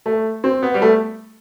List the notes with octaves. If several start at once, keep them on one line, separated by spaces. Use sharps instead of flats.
A3
C4
B3
G3
A3